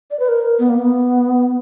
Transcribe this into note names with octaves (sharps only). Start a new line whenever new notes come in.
D5
B4
A#4
B3
A#3
B3